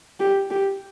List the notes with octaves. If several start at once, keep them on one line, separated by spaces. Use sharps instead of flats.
G4
G4